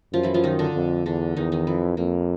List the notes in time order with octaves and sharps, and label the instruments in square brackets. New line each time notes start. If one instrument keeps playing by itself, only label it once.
[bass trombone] F#2 [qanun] F3 F4
[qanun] E3 E4
F3 F4
D#3 D#4
D3 D4
[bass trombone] F2
[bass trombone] E2 [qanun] D3 D4
[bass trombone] E2 [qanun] D#3 D#4
[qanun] D#3 D#4
[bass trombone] F2 [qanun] E3 E4
[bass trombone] F2 [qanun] A#3